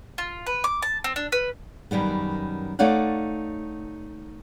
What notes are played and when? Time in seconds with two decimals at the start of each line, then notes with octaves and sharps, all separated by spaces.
0.18 F4
0.46 B4
0.64 D6
0.82 A5
1.04 C4
1.16 D4
1.32 B4
1.91 F#2 D#3 G3 B3
2.79 A3 D#4 C#5 D5 F5 F#5